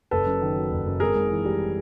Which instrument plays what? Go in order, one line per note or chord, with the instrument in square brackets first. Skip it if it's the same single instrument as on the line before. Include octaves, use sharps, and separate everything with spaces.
[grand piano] F#1 A4 B4
F#2
D#3
F#3
F#1
F#2
G#1 G#4 A#4
G#2
E3
G3